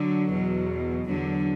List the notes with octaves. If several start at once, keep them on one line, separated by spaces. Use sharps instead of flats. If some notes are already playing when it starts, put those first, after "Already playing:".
Already playing: D3 F#3
E2 B2
E2 D3 F#3